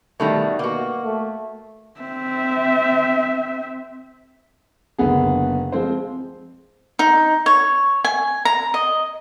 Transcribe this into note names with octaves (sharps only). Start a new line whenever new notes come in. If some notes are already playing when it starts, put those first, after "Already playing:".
B2 D#3 G3 A3
B2 A#3 F#4
A3
C4 E5
F#1 D3 B3 G#4
F3 G#3 C4 C5
D#4
C#5
G#5
A#5
D#5